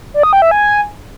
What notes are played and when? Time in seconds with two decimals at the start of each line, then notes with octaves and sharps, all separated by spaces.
0.14 D5
0.23 D#6
0.33 G5
0.42 E5
0.51 G#5